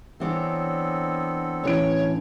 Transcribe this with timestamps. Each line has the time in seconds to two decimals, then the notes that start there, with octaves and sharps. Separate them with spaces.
0.20 E3 B3 C4 D4 A4 C#5
1.63 A1 D3 E3 C#5 D7